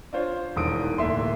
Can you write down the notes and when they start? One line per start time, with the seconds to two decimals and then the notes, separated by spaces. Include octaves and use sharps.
0.13 D4 F4 C5 C#5
0.56 E1 E2 D#3 D#6 D7
0.98 D1 A#3 E5 C6